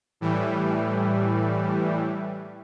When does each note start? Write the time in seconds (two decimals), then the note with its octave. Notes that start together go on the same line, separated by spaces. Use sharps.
0.21 A2 E3 G3